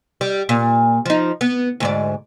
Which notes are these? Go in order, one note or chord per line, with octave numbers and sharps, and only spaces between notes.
G3
A#2
F3 D#4
B3
D2 G#2 D5